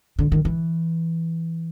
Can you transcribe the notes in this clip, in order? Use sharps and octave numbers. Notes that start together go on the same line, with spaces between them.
D3
D#3
E3